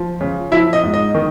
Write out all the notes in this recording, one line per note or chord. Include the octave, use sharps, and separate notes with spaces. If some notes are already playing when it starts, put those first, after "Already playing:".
Already playing: F3
C#3
F3 E4 E5
D#5
G#2
D#5
D#3